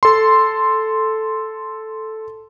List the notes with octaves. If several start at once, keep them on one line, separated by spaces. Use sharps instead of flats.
A4 C6